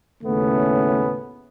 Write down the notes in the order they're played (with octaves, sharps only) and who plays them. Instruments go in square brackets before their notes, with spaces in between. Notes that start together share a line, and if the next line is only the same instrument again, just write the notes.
[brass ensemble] D#2 A2 C#3 A3 B3 C#4